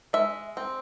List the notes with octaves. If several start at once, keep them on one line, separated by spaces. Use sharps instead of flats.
G#3 E5
C4